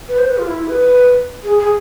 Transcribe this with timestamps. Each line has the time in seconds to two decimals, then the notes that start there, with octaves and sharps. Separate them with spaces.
0.08 B4
0.18 C5
0.28 B4
0.38 F4
0.47 E4
0.58 E4
0.68 B4
1.43 G#4
1.59 G#4